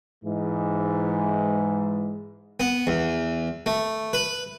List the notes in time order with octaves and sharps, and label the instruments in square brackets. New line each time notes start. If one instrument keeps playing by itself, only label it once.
[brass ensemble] G#2 E3 G#3
[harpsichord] B3
E2
A3
B4